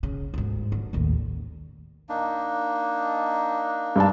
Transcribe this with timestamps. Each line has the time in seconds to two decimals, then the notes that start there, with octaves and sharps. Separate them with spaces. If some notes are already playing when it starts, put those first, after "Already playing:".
0.03 C#3
0.34 D2 G#2
0.72 D3
0.93 A1 D#2
2.09 A#3 D4 D#4
3.96 G2 D5 A5